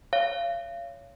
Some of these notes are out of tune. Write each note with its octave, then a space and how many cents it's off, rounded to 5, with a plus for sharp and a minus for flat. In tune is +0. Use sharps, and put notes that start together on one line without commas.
C#5 +15 F5 -35